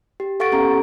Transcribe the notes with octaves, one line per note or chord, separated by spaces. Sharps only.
G4
A4 F5 F#5 C#6 A6 D7
B3 C#4 G4 A4 A#5